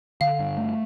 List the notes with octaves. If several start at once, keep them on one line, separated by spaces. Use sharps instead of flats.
D3 F5
G2
A3